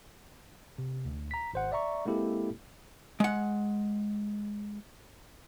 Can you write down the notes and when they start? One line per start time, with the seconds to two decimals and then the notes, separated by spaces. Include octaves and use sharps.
0.78 C3
1.05 D2
1.31 A#5 B6
1.54 G#1 C5 F#5
1.72 D5 E5 A#5 C#6
2.05 G#3 A#3 C4 E4 G4 A4
3.20 G#3 F#5